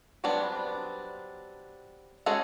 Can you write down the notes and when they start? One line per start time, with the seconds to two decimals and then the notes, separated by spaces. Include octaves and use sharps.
0.24 F#3 G3 B3 C4 D4
2.26 G#3 C#4 F#4 G#4 A4